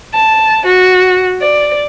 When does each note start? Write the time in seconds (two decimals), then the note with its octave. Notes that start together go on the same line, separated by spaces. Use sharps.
0.13 A5
0.64 F#4
1.40 D5